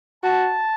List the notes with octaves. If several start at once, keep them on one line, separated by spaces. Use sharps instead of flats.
F#4 A5